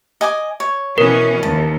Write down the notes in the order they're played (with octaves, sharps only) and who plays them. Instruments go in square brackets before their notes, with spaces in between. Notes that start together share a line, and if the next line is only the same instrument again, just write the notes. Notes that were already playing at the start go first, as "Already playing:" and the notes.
[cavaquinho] D#5 G#5 D6
C#5
[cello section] B2 E3 C#4 [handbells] A#4
[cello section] D#2 [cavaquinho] A5